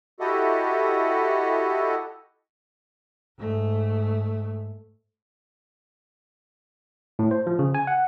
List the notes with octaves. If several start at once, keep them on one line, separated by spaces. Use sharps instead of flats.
E4 F#4 G4 A4 D#5
G#2 A3
A2
C5
F3
C#3
G#5
F#5